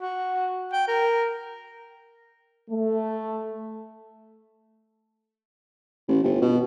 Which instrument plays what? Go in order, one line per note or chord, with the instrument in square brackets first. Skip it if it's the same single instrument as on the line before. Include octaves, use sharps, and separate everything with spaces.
[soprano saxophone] F#4
G5
A#4
[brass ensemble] A3
[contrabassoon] A1
G1
B2